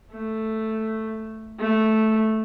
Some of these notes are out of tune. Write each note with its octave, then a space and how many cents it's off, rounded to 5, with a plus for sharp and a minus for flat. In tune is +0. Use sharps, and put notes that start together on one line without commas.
A3 +0
A3 -5